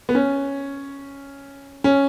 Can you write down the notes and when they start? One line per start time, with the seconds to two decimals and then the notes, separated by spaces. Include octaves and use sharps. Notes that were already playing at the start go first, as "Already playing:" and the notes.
0.09 B3
0.15 C#4
1.84 C#4